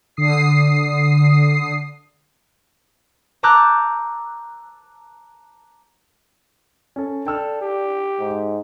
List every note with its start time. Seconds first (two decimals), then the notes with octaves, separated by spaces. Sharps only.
0.17 D3 D#6 C7
3.43 A5 A#5 D6 E6 F#6 G6
6.96 C#4 A4
7.27 D4 A4 G5 E6 F6
7.61 G4
8.19 G#2